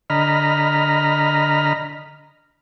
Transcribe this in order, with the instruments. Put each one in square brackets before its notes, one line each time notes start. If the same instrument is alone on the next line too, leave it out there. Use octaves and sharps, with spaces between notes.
[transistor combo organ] D3 D#5 A#5 B5 F6